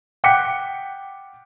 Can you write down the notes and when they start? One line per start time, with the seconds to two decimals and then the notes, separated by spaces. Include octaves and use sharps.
0.24 F#5 G5 D6 F#6 B6 C#7